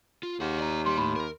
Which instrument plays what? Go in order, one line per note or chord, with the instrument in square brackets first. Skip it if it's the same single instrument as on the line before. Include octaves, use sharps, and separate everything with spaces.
[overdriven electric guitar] F4
[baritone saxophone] D#2 [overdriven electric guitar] G#4 F#5
[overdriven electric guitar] D5 A#5
[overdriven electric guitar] G3 [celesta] C6
[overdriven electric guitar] A2 [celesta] B5 C6
[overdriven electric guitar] A#4